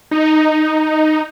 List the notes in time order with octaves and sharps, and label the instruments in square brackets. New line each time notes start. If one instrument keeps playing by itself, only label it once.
[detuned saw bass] D#4